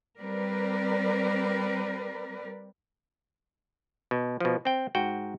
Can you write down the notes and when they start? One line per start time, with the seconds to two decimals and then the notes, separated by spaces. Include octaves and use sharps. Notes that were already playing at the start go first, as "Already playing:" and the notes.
0.19 G3 C4 A#4 B4 D5
4.11 B2
4.40 B2 F3
4.65 C4 G5
4.95 G#2 F#4 G5